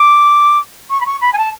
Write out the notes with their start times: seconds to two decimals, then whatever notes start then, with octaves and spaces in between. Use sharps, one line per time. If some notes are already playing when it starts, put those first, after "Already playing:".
Already playing: D6
0.90 C#6
1.00 B5
1.05 C#6
1.21 B5
1.33 G#5
1.37 A5